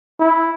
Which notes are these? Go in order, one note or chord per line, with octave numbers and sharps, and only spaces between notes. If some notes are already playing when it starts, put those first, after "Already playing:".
E4